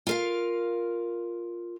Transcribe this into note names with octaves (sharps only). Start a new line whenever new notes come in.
F4 A#4 F5